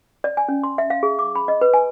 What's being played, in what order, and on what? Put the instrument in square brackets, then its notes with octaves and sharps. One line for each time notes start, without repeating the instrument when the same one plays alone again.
[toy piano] D5
G#5
C#4
C6
E5
F5
G#4
D6
B5
D#5
B4
G#5